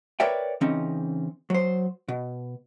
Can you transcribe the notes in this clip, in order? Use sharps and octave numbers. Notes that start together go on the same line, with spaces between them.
A#4 B4 C#5 D5 E5 G5
C#3 E3 C4 C#4 D#4
F#3 C5
B2